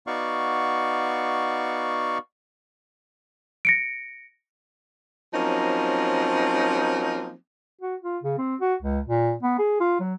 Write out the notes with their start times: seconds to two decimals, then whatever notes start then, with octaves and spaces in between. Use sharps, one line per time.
0.07 B3 D#4 F#4 D5 F5 C#6
3.65 A#6 C#7 D7
5.33 F3 F#3 A#3 C4 C#4 D#4
7.81 F#4
8.02 F4
8.24 C#3
8.38 C4
8.61 F#4
8.82 C#2
9.08 A#2
9.43 B3
9.59 G#4
9.80 F4
10.00 F#3